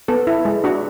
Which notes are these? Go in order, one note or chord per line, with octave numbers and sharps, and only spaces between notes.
B3 A4
E4
G#3
D4 F#4